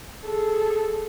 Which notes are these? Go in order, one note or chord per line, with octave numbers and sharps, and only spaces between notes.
G#4 A4